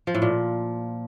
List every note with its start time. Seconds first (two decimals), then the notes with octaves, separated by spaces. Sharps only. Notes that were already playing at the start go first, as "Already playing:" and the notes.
0.07 F3
0.14 A2
0.22 A#2